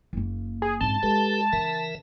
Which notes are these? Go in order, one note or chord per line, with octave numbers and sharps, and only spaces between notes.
F#1 A#3
G#4
G#2 C#3 C4 A5
G#3 G4 A4 B4
C#3 E3 A#4 E5